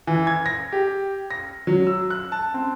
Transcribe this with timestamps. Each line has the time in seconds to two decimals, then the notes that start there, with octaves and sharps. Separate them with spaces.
0.07 E3
0.27 G#6
0.46 A#6
0.72 G4
1.31 A#6
1.67 F#3
1.87 E6
2.10 F#6
2.32 A5
2.54 C4